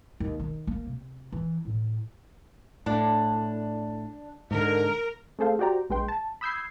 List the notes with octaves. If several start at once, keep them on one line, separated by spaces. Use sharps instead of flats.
D#2
D#3
A#3
C3
E3
A2
A2 D4
G#2 D3 A#4
A3 C4 G#4 A4 C5 F5
F#4 G4 C5 D5 G5 A#5
A#1 G#3 B4 G5 C6
A5
B5 D#6 E6 G6 G#6 C7